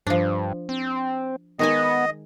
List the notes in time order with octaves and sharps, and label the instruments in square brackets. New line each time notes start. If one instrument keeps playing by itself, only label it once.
[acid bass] G2 [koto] F3 D4
[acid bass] C4
[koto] D#3 G#3 G#5 [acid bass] B3 [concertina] D#5